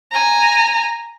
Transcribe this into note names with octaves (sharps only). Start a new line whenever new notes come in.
G#5 A#5